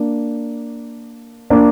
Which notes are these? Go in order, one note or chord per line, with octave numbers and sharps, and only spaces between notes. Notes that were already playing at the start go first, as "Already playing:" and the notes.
Already playing: A#3 D4
A#3 D4